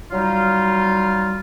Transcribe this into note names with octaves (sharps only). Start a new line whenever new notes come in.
F#3 G3 D#4 F4